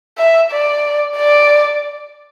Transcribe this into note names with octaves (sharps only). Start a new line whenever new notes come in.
E5
D5
D5